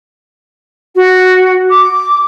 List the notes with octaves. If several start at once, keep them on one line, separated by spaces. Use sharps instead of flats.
F#4
D6